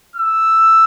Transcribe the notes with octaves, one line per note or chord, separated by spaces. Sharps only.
E6